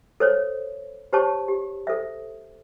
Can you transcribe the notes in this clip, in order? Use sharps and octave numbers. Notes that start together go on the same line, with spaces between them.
A4 C5 C#5
G4 C5 C#5 A5 C#6
G4
A4 C5 E5